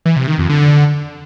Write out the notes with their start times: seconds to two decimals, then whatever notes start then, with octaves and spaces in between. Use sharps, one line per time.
0.06 E3
0.17 C3
0.27 D#3
0.38 F2
0.49 D3